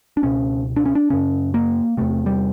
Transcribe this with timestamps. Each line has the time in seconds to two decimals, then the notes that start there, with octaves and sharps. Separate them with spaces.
0.17 D4
0.23 C#2 B2 C#4
0.76 D4
0.86 C#4
0.95 D4
1.10 F#2 C#3 C#4
1.54 A#3
1.97 E2 C3 A3
2.26 G3